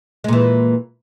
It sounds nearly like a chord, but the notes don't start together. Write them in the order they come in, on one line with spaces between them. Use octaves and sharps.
G#3 A#2 E3